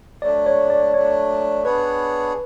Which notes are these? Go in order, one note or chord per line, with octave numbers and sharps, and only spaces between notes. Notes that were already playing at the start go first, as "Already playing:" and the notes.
F#3 A3 D4 D5
C#5
D5
F#3 A3 D4 C#5
B3 D4 G#4 B4 C#5